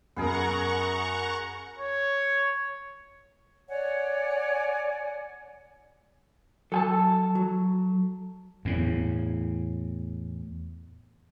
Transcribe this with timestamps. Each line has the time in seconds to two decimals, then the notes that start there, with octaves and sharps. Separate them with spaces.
0.16 F#2 B3 G#4 A#4 F#5 A#5 C#6
1.78 C#5
3.68 C#5 D5 F#5 G#5
6.72 F#3 A4 G#5 A5
7.35 F#3
8.65 E2 A2